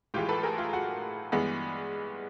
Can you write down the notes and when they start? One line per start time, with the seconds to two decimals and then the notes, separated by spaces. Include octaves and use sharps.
0.14 A2 E3 G#3 F4 G4
0.29 A4 B4
0.43 G#4 A#4
0.58 F4
0.73 F#4
1.32 G2 E3 G#3 B3